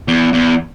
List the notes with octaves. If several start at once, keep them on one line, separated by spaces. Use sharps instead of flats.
E2
E2